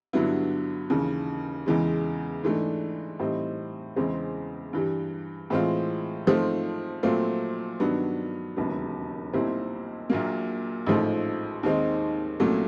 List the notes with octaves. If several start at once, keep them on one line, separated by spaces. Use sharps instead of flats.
G2 D3 F#3 B3 E4
D#2 C#3 E3
E2 C#3 E3 G#3
G#2 E3 A3 D4
A2 E3 G3 C4 D#4
E2 C#3 E3 G#3 C4
G2 E3 G3
A2 E3 G#3 C4 F4
G#2 F3 A3 C4
A#2 F#3 A3 C4 F4
G2 D#3 F#3 B3 D4
E1 D#2 C#3 F#3 B3
B1 A#2 G3 C4 E4
A#1 A#2 F#3 A#3
A1 G#2 F3 A3
D#2 D#3 G#3 C4 D#4
C2 A#2 F#3 A3 C#4